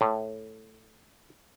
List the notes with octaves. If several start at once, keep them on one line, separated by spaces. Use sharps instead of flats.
A2